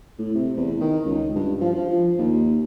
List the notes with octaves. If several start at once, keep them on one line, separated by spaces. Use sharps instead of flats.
A2
C3
E2
D#3
C#2
G2
F3
F3
D#2